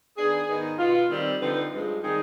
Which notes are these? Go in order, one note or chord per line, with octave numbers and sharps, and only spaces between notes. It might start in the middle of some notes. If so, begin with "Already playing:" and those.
D#3 B3 D4 G#4
G#2 D#3 B3 D#4
B2 B3 F4
D#3 G3 C4
D3 F3 C4 D#4 B4
G2 F3 G#3
D#3 G3 C4 D#4 G#4